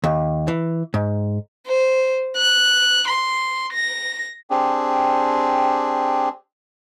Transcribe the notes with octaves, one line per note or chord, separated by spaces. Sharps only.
D#2
E3
G#2
C5
F#6
C6
A#6
C4 D4 G4 G#4